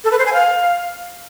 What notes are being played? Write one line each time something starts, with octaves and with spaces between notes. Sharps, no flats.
A4
B4
C5
G#5
F5